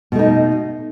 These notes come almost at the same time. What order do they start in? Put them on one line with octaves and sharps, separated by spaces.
B2 A3 D#4